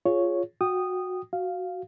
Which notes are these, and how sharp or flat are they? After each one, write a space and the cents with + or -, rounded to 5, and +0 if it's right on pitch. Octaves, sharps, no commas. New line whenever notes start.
F4 +0 G#4 +0 C#5 +0
F#4 -15 G5 +0 D#6 -10
F#4 +0 F5 +0